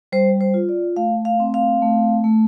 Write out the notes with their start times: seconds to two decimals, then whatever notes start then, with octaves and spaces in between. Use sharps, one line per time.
0.12 G3 C5
0.41 C5
0.54 F4
0.69 D5
0.97 A3 F5
1.25 F5
1.40 C4
1.54 F5
1.82 A3
2.24 A3